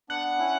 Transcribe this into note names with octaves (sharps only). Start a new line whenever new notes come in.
B3 D4 F#5
C#4 E4